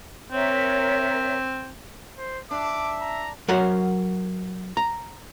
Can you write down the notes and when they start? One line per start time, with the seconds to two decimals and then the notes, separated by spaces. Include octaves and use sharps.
0.32 C4 A#4 C#5 E5
2.18 C5
2.51 D4 E5 D6
3.01 A#5
3.48 F#3 F#4 A#4 C5 F#5
4.77 A#5